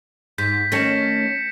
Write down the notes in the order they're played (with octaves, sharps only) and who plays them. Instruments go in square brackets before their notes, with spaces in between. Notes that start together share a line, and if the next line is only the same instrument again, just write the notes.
[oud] G#2 [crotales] G6 B6
[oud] D#3 A3 C#4 [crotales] A#6 C#7 E7